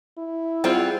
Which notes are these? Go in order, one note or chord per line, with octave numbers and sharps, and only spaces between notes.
E4
G3 C4 F4 G#4 F#5